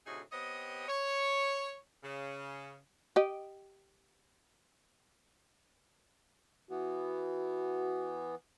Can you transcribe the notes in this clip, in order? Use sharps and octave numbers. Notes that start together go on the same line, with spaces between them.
D2 A2 C3 D#4 F#4 G#4
B3 C4 G4 C#5 D#5
C#5
C#3
G4 D#5
E3 B3 F#4